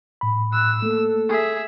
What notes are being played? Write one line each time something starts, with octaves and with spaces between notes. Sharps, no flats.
A2 B5
E6 F#6
A3 A#3 A4
G#4 E5